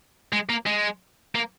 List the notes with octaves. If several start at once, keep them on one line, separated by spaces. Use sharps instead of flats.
G#3
A#3
G#3
A#3